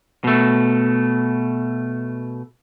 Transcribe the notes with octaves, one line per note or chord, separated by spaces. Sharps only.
B2 A3